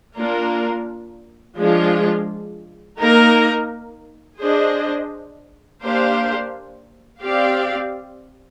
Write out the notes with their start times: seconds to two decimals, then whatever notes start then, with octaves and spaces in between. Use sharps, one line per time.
0.16 A#3 D4 F4 A#4
1.57 F3 G#3 D4 F4
2.98 A#3 D#4 A#4
4.39 D4 G#4 C5 D#5
5.81 A#3 D4 G4 C5 F5
7.22 C4 G4 D5 F5